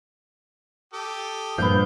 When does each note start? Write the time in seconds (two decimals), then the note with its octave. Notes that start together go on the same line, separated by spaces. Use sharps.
0.94 G4 A4 D#6
1.58 G2 A#2 F3 B3 F5 G6